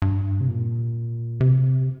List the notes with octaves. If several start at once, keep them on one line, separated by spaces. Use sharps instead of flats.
G2
C3
A#2
C3